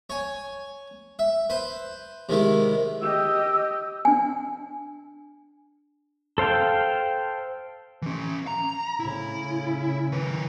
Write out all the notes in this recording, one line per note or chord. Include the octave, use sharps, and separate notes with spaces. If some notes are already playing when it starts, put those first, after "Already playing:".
C#5 G#5
E5
B4 C5
C3 D#3 G#3 E4
G4 D#5 E6
D4 G#5
A4 C5 F5 G5
E3 C#4
A#5
A2 C#3 E4
D#3 B4